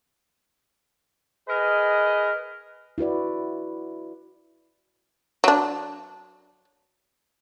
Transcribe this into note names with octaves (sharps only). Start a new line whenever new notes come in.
G#4 A#4 B4 D#5
E4 F#4 B4 D5
F#3 D4